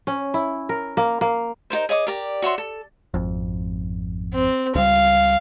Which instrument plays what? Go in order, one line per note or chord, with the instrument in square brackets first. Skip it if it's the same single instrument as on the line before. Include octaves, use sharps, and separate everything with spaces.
[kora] C#4
E4
A#4
A#3
A#3
[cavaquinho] D#4 F4 A#4 C5
G#4 C#5 D#5 D6
G4 A#4 D5
F#4 C#5 E5 C6
A4
[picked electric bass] G#1 F2
[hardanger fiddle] C4
[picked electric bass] C#2 G3 [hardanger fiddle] F5